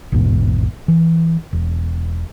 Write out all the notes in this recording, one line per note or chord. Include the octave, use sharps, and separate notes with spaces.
A1 E2 G#2 B2
E3
E1